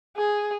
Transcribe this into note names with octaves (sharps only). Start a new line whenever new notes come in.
G#4